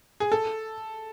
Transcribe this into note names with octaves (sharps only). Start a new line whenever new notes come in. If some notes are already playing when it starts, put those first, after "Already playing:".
G#4
A4